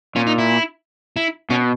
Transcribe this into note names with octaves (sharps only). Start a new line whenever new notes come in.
A#2 C#4
D#4
E4
E4
B2 C#4